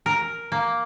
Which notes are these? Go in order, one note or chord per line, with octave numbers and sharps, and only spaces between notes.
A#4
A#3